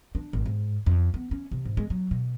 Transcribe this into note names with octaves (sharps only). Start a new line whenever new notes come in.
D4
G#1
G#2
F2
B3
C#4
C3
G#2
G#3
F#3
B2